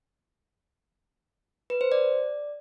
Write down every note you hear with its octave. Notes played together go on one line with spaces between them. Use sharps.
B4
C5
D5